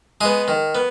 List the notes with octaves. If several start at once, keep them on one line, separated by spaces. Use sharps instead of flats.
G#3 B3 G#4
D#3
B3